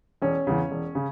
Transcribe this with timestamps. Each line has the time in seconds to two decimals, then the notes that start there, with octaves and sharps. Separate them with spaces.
0.22 E1 C#4
0.47 E2 C#3
0.71 E1
0.95 C#3